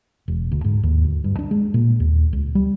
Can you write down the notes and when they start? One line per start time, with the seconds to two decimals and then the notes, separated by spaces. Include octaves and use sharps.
0.28 E1
0.52 D2
0.64 G#2
0.83 D#2
1.05 D2
1.24 G2
1.39 D4
1.51 G#3
1.74 A#2
2.00 D#2
2.33 C#2
2.55 G3